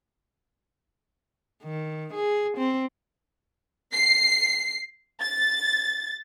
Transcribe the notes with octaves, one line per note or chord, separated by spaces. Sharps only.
D#3
G#4
C4
C7
A6